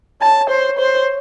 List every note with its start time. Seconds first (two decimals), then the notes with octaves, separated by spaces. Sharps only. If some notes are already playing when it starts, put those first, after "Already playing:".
0.22 C#5 A5
0.50 C5
0.79 C5